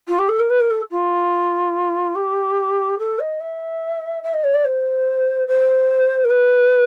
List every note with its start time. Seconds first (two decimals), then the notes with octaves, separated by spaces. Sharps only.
0.08 F4
0.19 G4
0.29 A4
0.39 A#4
0.50 B4
0.60 A#4
0.70 A4
0.91 F4
2.15 G4
2.99 A4
3.19 D#5
3.40 E5
4.23 E5
4.34 D#5
4.44 C#5
4.54 D5
4.65 C5
5.48 C5
6.24 A#4
6.30 B4